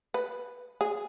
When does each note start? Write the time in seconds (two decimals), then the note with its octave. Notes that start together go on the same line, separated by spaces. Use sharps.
0.14 B4
0.81 G#4